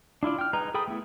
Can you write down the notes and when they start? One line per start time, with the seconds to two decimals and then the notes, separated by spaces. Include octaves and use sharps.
0.23 D4 E4 F4 D5
0.39 G5 F6
0.53 G#3 D#4 B4 A#5
0.74 G#4 A4 G5 B5 D#6
0.88 A3 B3 E4